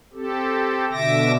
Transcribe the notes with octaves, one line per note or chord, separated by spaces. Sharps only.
C4 G4 A4
B2 D3 E5 D6 A#6